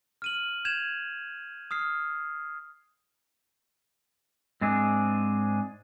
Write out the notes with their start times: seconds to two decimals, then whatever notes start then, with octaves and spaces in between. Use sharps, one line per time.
0.22 F6 D#7 F#7
0.65 G6 G#6 E7 F7
1.71 D#6 F6 C7
4.61 G#2 C4 D4 G#4